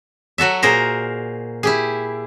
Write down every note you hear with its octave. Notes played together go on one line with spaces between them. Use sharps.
F#3 F#4 A4 E5
A#2 G#4 A#4 C5 A#5
E4 G4 G#4